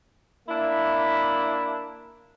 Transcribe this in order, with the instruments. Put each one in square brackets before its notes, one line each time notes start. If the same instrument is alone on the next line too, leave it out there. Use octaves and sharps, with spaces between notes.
[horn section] A#3 D4 E4